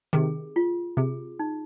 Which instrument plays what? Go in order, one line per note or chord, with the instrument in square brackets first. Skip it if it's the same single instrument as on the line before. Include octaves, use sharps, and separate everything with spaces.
[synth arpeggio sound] C3 D#3 [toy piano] G#4
[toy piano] F4
[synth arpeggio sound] C3 [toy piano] G#4
[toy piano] D#4